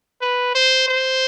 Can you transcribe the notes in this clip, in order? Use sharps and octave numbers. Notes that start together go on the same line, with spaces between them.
B4
C5
C5